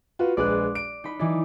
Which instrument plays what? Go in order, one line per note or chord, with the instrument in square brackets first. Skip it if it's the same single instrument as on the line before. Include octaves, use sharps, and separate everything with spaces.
[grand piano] F4 F#4 B4
[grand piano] A#1 G#3 B4 [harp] D5 F#6
[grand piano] D7
[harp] D#4 B5
[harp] E3 D5 [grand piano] D#4